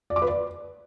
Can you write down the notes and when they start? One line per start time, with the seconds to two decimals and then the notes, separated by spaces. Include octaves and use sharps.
0.10 D5
0.16 D6
0.22 B4
0.28 D5